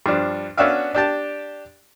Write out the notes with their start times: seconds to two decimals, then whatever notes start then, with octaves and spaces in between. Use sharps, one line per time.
0.06 G2 F3 D4
0.57 B3 C#4 D4 F#4 E5 F5
0.95 D4 G4 A5